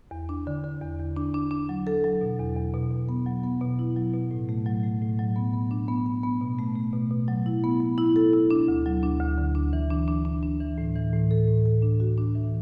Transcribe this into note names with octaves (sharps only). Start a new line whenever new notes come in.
E2
D4
D3
D3
E2
E2
D4
D4
D4
F#3
A4
F#3
B2
E2
E2
B2
B2
B3
F#3
B3
B2
E4
F#3
B2
A2
A3
F#3
A3
A2
F#3
B3
B3
D4
B3
B3
B3
B2
A3
A3
B2
B2
F#3
E4
B3
B3
E4
A4
E4
D4
D2
F#3
D4
D2
D3
D4
E3
D4
D4
D4
D4
E3
A2
E3
A2
A4
A2
A4
D4
F#4
D4
E3